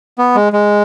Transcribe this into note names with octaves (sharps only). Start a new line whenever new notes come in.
B3
G#3
G#3